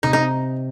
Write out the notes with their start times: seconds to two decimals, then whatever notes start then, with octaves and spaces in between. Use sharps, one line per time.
0.03 C3 D#4
0.13 D#4
0.18 C4